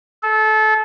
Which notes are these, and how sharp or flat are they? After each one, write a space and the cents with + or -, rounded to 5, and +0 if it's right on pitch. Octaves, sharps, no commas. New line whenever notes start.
A4 -25